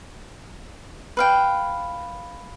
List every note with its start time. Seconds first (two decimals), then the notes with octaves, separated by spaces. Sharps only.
1.17 B4 F5 G5